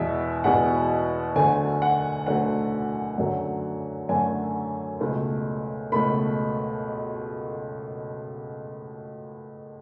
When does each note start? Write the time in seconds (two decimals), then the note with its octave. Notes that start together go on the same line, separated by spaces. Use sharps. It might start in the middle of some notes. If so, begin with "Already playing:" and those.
Already playing: E2 B2 G#3 E5
0.44 E2 B2 G#3 F#5
1.35 D2 D3 F#3 A3 G#5
1.82 F#5
2.26 D2 D3 F#3 A3 F#5
3.18 F#2 D3 F#3 A3
4.09 F#2 D3 F#3 A3 G#5
5.00 C#2 B2 A3
5.92 C#2 B2 A3 B5